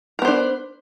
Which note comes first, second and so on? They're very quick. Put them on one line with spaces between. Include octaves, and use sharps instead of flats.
A#4 B3 C5 D4